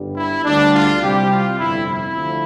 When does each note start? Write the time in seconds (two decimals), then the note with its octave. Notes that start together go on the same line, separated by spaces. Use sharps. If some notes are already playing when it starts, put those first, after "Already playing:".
Already playing: G1 G2 D3 G3
0.17 E4
0.45 D2 D3 G3 D4
0.73 F4
1.01 C2 C3 G3 G4
1.30 F4
1.57 G1 F2 C3 G3 E4
1.86 E4
2.14 D2 D3 F3